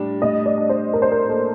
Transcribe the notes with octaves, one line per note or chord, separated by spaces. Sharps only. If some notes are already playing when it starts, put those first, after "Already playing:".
Already playing: A2 G3 D4
A2 D#5
D5
D4
C5
D4 A#4
C5
A#4
A#3 A4